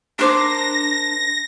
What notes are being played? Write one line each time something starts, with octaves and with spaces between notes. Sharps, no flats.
D4 A#4 C5 D6 A#6